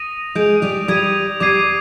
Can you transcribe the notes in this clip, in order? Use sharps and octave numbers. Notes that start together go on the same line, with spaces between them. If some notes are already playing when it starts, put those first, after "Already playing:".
Already playing: D#6 A#6 D#7
G#3 G#4 G6 D7 F7
G3 G4
G3 G4 D#6 G#6 D#7
G3 G4 D6 G#6 C7 D#7